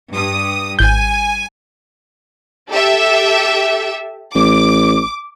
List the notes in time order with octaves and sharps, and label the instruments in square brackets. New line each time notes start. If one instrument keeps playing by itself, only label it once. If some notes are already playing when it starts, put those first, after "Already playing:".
[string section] G2 D#6
[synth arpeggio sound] G#1 G6 [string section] G#5
[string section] G4 A4 E5
[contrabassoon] A1 [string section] D6